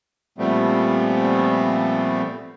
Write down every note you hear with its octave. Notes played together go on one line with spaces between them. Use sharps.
A#2 F3 G3 A3 B3 C4